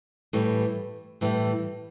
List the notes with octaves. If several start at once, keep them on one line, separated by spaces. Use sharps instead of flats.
A2 E3 G3
A2 E3 G3